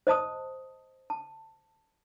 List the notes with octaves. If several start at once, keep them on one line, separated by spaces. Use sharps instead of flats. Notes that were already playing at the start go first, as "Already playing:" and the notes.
C5 D#5 A5 D#6
A5